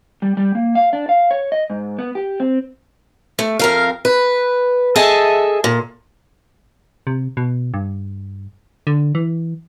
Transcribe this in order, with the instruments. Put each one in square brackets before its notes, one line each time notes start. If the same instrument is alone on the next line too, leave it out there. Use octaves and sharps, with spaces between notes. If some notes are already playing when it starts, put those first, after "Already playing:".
[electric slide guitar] G3
G3
A#3
F5
D4
F5
C#5
D#5
G#2
B3
G4
C4
[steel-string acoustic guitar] A3
F2 A#4 F5
B4
G#4 A4 D#5 E5 G#5 A5
A#2
[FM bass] C3
B2
G2
D3
E3